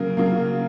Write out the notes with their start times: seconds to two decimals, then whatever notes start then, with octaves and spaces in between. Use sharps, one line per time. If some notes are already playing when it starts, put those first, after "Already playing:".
Already playing: C#3 F#3 A#3 A#4
0.17 C#3 F#3 A#3